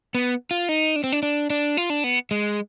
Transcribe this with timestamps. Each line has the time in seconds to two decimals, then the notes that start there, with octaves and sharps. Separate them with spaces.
0.15 B3
0.51 F4
0.69 D#4
0.96 D4
1.04 C4
1.12 D4
1.23 D4
1.50 D4
1.77 F4
1.90 D4
2.04 B3
2.31 G#3